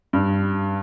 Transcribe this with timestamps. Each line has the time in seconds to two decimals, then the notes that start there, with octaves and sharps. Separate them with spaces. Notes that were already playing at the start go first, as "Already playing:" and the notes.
0.13 G2